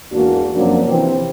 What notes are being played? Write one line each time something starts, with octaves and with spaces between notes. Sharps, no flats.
E2 G#2 A#3 D4 F#4
F#2 C3 F3 F#3 A#3 D4
C3 E3 F3 C4